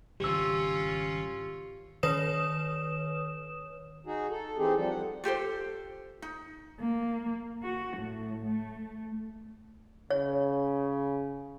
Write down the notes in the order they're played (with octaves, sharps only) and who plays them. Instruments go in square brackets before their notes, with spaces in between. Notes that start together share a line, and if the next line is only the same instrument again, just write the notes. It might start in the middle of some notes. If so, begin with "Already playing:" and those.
[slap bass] G#1 C#3 G3 [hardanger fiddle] C#4 F4 [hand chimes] G4 E6
[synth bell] D#3 B4 C#5 D#6 E7
[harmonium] D#4 F#4 G#4
A4
E3 C4 D#4 G4 G#4
F3 G3 A4
F#5
[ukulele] F4 G4 A4 C5
D#4
[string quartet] A#3
F#4
A2
A3
[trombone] C#3 [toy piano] C#5